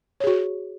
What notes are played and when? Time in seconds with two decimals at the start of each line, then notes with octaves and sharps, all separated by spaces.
0.20 C#5
0.24 G#4
0.27 F#4